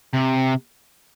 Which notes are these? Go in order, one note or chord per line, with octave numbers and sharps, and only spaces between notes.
C3